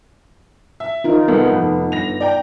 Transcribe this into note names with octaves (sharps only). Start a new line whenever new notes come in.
E5
D#4 F4 A#4
C2 G#3 B3 A4
F1
G1 A#6 F7
D5 G5 A#5